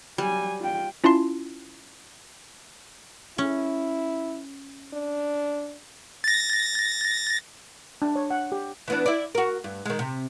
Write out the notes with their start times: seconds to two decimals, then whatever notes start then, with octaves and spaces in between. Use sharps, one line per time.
0.18 F#3 G3 G#5
0.60 F4 G5
1.04 C#4 E4 F4 A5 C6 C7
3.38 C#4 E4
4.94 D4
6.24 A6 A#6
8.02 D4
8.16 C#5
8.30 F#5
8.52 G4
8.88 E3 B3 D4
9.06 E4 D5
9.35 F#4 A#4
9.64 G2
9.85 D#3 G#3
9.99 C3